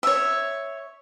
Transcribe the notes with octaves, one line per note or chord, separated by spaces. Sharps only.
C#5 E5